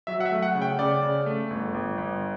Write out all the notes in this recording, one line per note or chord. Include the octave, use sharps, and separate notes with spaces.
F#3 E5
F#5
E5
A3
F#5
C#3
G5
C#3 D5
C#3
A3
G1
G1
G1